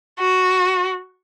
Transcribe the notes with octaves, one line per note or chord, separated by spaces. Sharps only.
F#4